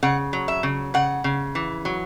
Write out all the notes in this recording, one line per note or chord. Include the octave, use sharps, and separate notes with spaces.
C#3 F#5
F#3
E5
C#3
C#3 F#5
C#3
E3
F#3